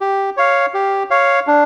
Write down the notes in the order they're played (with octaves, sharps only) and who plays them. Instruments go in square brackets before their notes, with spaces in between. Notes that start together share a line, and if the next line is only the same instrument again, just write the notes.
[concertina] G4
C#5 F5
G4
C#5 F5
D4